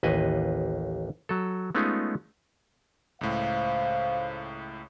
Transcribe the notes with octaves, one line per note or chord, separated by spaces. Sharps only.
A1 D#2 B4 D#5 G#5
F#3 A4
G#3 A3 B3 C#4 D#4 F4
C#2 A2 C5 F5